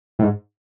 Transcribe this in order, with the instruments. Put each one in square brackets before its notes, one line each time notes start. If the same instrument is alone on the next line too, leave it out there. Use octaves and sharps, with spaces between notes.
[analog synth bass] A2
G#2